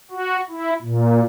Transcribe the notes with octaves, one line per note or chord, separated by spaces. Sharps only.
F#4
E4
A#2